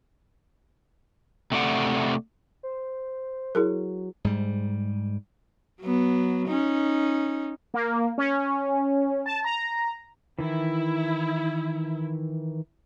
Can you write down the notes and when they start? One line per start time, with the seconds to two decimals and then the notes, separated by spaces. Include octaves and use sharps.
1.52 C3 A3 D5 F#5
2.63 C5
3.55 F#3 E4 G#4 A#4
4.25 G#2 G3
5.82 F#3 B3
6.48 C#4 D#4
7.74 A#3
8.18 C#4
9.26 A5
9.44 A#5
10.39 D#3 E3 E4